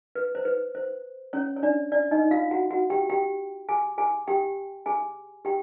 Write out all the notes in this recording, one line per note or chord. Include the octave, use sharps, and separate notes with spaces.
B4
C5
B4
C5
C#4 C#5
C#5
D4 D5
D4 D5
D#4 D#5
F4 F5
F#4 F#5
F#4 F#5
G4 G5
G4 G5
G#4 G#5
G#4 G#5
G4 G5
G#4 G#5
G4 G5